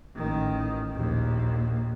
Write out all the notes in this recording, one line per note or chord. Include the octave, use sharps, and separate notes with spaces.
A1 D#3
A#1 D#2